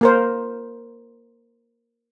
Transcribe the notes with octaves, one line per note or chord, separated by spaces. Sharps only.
A#3 A#4 C5